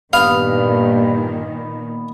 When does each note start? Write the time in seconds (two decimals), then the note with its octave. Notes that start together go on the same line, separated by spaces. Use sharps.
0.13 G2 A#2 D#3 B3 F5